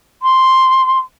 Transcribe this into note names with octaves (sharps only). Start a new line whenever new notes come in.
C6